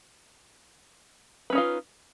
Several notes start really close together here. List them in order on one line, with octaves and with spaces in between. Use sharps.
B4 C#4 D#4 F4